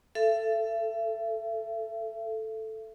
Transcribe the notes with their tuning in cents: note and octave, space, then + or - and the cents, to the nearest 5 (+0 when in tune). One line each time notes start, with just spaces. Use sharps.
A4 +0 E5 +35